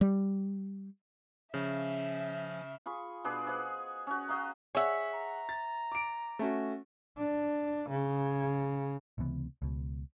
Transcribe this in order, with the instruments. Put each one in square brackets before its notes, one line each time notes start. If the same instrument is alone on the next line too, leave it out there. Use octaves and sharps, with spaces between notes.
[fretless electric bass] G3
[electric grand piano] C#3 [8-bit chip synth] F3 C#4 [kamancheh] E5
[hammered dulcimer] F4 G#4 B5 C#6
B2 D4 G#4 B4
G#4 C5 D#5 F#5
C#4 F#4
F#4 D#5 F5 A#5
[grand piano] G#4 F#5 [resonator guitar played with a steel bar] C#5 E5
[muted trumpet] A#5
[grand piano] A6
D6 D7
A3 C#4 F#4
[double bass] D4
C#3
[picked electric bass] C#2 C3 E3 B3
C#2 B2